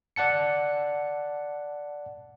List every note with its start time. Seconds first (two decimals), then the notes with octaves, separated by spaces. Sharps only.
0.16 D5 F#5 A5 C#7